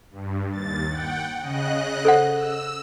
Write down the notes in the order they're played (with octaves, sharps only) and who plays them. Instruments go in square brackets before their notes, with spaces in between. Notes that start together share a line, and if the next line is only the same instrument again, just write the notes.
[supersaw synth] G2
D#2 A6
F#5 G5
C#3 D#5 F#6
[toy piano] A4 C5 F#5
[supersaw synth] E6